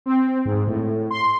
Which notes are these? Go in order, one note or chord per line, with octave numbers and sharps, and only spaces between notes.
C4
G#2
A2
C6